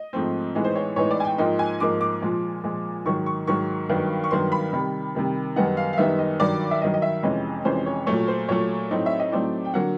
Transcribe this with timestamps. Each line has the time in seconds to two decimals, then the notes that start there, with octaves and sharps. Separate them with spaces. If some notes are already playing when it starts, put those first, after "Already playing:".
Already playing: D#5
0.13 G#2 F3 A3 C4
0.55 A2 E3 G#3 B3 D#4
0.64 C5
0.75 C#5
0.96 A2 E3 G#3 B3 D#4 C#5
1.11 D5
1.20 G#5
1.25 G5
1.38 G#2 F3 A#3 D#4 G5
1.59 G#5
1.80 G#2 F3 A#3 D#4 D6
2.01 D6
2.22 A#2 F3 G#3
2.64 A#2 F3 G#3
3.05 G#2 D#3 F#3 C#6
3.26 C#6
3.47 G#2 D#3 F#3 C#6
3.89 G2 D#3 F#3 B3
4.24 C#6
4.31 G2 D#3 F#3 B3 C6
4.52 B5
4.73 C3 D#3 G3
5.15 C3 D#3 G3
5.56 F#2 D#3 G3 B3 D#4 F#5
5.77 F5
5.93 F5
5.98 F#2 D#3 G3 B3 D#4 E5
6.19 D#5
6.40 G2 D#3 F#3 D5
6.71 E5
6.82 G2 D#3 F#3 D#5
6.94 D#5
7.02 E5
7.23 F2 C3 E3 G#3 C#4 D#5
7.65 F2 C3 E3 G#3 C#4 C5
7.86 C#5
8.06 A#2 F#3 A3 C#5
8.28 C5
8.49 A#2 F#3 A3 C#5
8.91 A2 F#3 A3 C4 D#4
9.06 E5
9.19 D#5
9.32 A2 F#3 A3 C4 D#4 D5
9.65 G5
9.74 D3 F#3 A#3 F#5